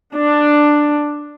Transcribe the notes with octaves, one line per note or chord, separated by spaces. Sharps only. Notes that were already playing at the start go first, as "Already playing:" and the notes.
D4